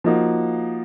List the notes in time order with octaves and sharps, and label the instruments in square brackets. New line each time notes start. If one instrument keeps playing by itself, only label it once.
[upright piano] F3 A#3 D#4 F#4